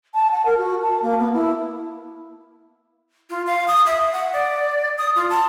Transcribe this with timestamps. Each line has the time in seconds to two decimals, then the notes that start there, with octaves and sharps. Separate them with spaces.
0.14 A5
0.30 F#5
0.45 A#4
0.57 F#4
0.82 A5
1.01 A#3
1.18 B3
1.33 E4
3.30 F4
3.46 F5
3.68 D#6
3.86 E5
4.13 F#5
4.33 D5
4.98 D#6
5.16 F4
5.30 A5